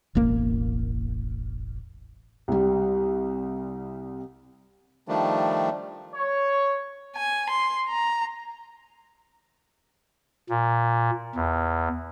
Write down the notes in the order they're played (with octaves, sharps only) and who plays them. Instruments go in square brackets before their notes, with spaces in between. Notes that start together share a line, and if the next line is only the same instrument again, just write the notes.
[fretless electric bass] E1 A1 A#3
[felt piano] C2 G3
[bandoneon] D#3 F3 G3 A3 D4
[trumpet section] C#5
[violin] G#5
C6
A#5
[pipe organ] A#2
E2